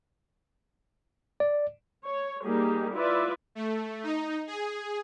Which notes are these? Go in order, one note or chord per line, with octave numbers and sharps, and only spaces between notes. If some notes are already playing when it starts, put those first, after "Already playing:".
D5
C#5
G3 A#3 D#4 G4 G#4
E4 F4 B4 D5 E5
A3
D#4
G#4